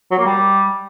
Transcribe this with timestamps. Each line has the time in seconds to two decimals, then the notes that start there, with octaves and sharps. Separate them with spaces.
0.11 F#3
0.18 A#3
0.26 G3